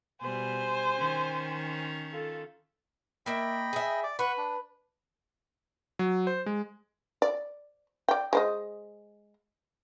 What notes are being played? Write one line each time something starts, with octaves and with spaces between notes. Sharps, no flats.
B2 G3 C5 G#5
D#3 C#4
F4 A4
A#3 D#5 E5 G5 B5
G#4 E5
D5 D6
B4 F#5 C#6
D4
F#3
C5
G#3
D5
D5 G5
G#3 C5 D#5